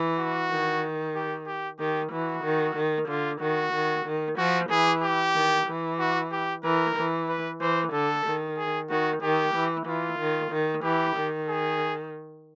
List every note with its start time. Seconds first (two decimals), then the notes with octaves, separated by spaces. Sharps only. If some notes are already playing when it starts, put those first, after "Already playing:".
Already playing: E3
0.18 F#4
0.50 D#3
1.15 G4
1.47 G4
1.79 D#3 G4
2.12 E3 F#4
2.44 D#3
2.76 D#3
3.09 D3 F4
3.41 D#3 F#4
3.74 D#3
4.06 D#3
4.38 F3 F#4
4.70 E3 G#4
5.03 G4
5.35 D#3
5.67 E3
5.99 F#4
6.32 G4
6.64 E3 A#4
6.96 E3
7.29 B4
7.61 E3 C5
7.93 D3 A4
8.26 D#3
8.58 G#4
8.90 D#3 F#4
9.22 D#3 G4
9.55 E3
9.87 E3 F4
10.19 D#3
10.52 D#3
10.83 E3 G4
11.16 D#3
11.49 G#4